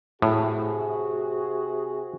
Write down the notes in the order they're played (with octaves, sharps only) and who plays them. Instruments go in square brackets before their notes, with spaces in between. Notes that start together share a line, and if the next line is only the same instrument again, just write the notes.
[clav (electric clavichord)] A2 [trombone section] C3 F#4 G#4